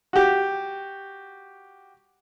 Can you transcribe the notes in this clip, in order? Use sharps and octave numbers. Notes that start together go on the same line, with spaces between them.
F#4 G4